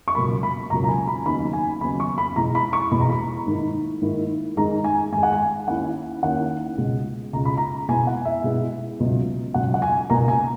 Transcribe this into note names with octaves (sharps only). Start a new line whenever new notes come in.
C#6
C#2 B2 F#3 A#3 B5
B5
C#2 B2 F#3 A#3 A#5
A#5
G#5
B5
D#2 C#3 F#3 B3 D#4 B5
G#5
D#2 C#3 F#3 B3 D#4 B5
C#6
B5
E2 B2 G#3 A#5
B5
C#6
E2 B2 G#3 B5
A#5
B5
G#2 D#3 A#3 E4
G#2 D#3 A#3 E4
G#2 D#3 G#3 A#5
G#5
G#2 D#3 G#3 G#5
F#5
G#5
D#2 D#3 A#3 C#4 E4 F#5
D#2 D#3 A#3 C#4 E4 F#5
C#2 B2 G#3
C#2 B2 G#3 A#5
B5
A#5
B2 G#3 B3 E4 G#5
F#5
E5
B2 G#3 B3 E4
C#2 B2 F#3 B3
C#2 B2 F#3 B3 F#5
F#5
G#5
C#2 B2 A#3 A#5
G#5